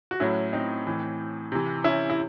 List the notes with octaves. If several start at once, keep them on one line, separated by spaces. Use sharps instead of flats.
F#4
A2 F#3 C#4 E4
C4 D#4
A2 E3
C3 E3
C#4 E4
E4